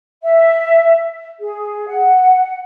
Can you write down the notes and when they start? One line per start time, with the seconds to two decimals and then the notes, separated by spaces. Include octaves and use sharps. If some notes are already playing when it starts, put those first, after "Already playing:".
0.23 E5
1.39 G#4
1.87 F#5